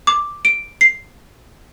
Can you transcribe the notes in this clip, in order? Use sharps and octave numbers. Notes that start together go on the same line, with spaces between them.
D6
D7
C7